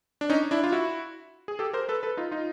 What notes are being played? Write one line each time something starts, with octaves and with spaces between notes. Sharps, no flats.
D4
C#4 D#4
D4 E4
F4
E4 F#4
G#4
G4 A4
A#4 C5
A4 B4
A4 B4
D#4 F4
D#4 F4